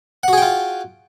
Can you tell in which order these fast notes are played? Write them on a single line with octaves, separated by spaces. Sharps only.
F#5 F#4 G#4 G5 F4